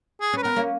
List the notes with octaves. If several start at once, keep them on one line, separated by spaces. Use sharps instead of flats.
G#4
C#4 B4
B3 A#4
A#3 C#4